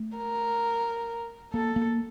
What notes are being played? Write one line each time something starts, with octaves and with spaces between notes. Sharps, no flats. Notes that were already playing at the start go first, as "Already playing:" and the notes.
Already playing: A3
A#4
A#3 A4
A#3